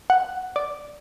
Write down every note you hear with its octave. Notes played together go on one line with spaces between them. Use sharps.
F#5
D5